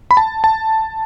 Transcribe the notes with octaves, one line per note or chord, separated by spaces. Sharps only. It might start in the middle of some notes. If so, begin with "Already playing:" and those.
B5
A5
A5